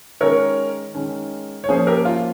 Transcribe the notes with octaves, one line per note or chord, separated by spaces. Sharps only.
D#3 G#3 C#4 A#4 C#5
D#3 G#3 C#4
C#5
F3 A#3 C#4 G#4 C5
G4 A#4
F4